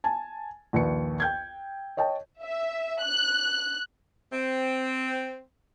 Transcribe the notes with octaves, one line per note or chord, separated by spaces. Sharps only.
G#5 A5
A#1 D#2 B4 C#7
G5 G6 G#6
C#5 D#5 G5 A5
E5
F#6
C4